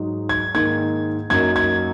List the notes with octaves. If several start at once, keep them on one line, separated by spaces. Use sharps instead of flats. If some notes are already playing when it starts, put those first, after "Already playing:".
Already playing: G#2 F#3 D#4
G#6
G#2 D#3 A#3 G#6
F#2 F#3 A#3 D#4 G#6
G#6